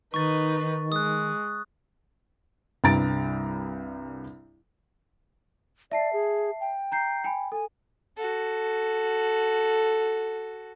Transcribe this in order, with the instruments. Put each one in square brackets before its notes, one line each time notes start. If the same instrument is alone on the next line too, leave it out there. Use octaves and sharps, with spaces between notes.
[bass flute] D#3 [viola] D#4 B4 [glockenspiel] C#6 A6
[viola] G#3 [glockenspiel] D#6 F#6
[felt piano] C2 G2 A#5 A6 D7
[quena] D5 [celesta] E5 A5 C7
[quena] G#4
G5
[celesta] A#5 G6 C7
G5 G#5 B5
[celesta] A4 [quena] G#5
[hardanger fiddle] F#4 A4